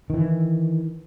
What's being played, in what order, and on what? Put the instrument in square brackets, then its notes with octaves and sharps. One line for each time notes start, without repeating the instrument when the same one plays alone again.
[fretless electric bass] D#3 E3